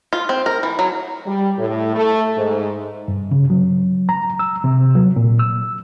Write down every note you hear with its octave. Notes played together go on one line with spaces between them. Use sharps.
F4
C4
A#4
E3
F#3
G3
A2
A3
G#2
G2
C#3
F#3
A#5
E6
C3
F#3
A#2
E6